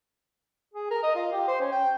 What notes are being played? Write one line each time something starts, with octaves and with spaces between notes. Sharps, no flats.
G#4
A#4
D#5
F4
G4
C5
C#4
G5